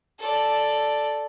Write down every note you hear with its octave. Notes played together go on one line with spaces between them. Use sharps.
A4 D5